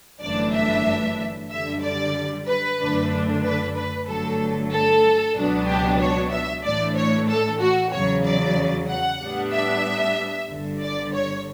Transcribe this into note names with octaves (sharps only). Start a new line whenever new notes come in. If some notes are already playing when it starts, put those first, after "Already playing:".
G1 F#2 E3 A3 D4 D5
E5
F#2 D3 G3 E5
D5
B4
F#2 D3 A3 D4
B4
B4
G1 G2 D3 F#3 A3 A4
A4
C#2 B2 F#3 B3 D4
G4
C#5
E5
A2 E3 A3 D4 D5
C#5
A4
F#4
E2 C#3 F#3 C#5
D5
F#5
A2 G3 B3 D4
E5
G1 G2 D3
D5
C#5